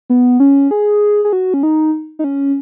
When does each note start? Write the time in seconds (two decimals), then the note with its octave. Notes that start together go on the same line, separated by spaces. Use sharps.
0.10 B3
0.40 C#4
0.71 G#4
1.25 G#4
1.33 F#4
1.54 C#4
1.63 D#4
2.19 D#4
2.24 C#4